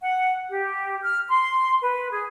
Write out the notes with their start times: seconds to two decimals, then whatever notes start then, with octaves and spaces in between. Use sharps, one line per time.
0.01 F#5
0.51 G4
1.03 F6
1.29 C6
1.82 B4
2.12 G#4